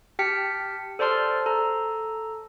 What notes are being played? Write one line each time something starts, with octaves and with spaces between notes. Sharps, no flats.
G4 G5 A5 F6 B6 C#7
A4 C5 D5 A5 C6 F6
A4 A#5